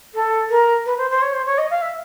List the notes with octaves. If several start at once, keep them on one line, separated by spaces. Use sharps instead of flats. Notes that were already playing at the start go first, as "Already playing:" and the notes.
A4
A#4
B4
C5
C5
C#5
C5
C#5
D#5
F5
E5